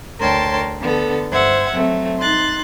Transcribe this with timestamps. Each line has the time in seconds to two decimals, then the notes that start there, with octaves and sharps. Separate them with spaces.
0.20 D2 A#4 C#5 G5 A5 C6
0.80 D3 B3 A4
1.32 G2 C5 E5 F#5 G#6
1.73 F#3 A3 C4
2.19 D#4 C6 F#6 A6